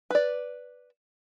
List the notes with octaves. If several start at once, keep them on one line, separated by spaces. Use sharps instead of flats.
B4 D5